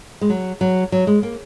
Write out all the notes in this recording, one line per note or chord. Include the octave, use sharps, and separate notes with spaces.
G#3
F#3
F#3
F#3
G#3
A#3